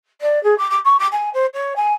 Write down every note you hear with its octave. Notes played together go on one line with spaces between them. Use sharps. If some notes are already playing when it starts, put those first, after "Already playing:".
D5
G#4
D6
D6
C#6
D6
G#5
C5
C#5
G#5